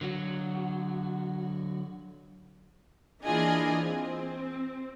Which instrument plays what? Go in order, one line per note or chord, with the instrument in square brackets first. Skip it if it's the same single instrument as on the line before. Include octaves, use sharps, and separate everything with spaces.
[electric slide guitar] D3 F#3 F#4
[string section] E3 A#3 D4 F4 G#4 D#5
C4